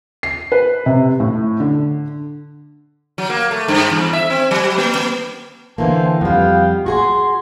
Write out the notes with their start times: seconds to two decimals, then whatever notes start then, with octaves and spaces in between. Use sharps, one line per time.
0.23 C7
0.52 B4
0.86 C3
1.20 A2
1.60 D3
3.18 F#3
3.30 A#3
3.51 A3
3.68 G2
3.92 E2
4.13 E5
4.30 C4
4.51 F#3
4.78 A#3
4.95 A#3
5.78 D3 E3 A#3 C5 G5 A5
6.21 F2 G3 B3 F5 G5
6.86 F#4 G#4 G#5 C6